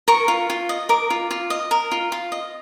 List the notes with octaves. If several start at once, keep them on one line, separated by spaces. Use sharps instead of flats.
A#4 C#6
F4
F4
D#5
A#4 D6
F4
F4
D#5
A#4
F4
F4
D#5